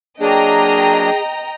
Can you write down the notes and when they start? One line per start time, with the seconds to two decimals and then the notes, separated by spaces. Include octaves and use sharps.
0.20 F#3 A#3 D4 G#4 D#5 G5 A#5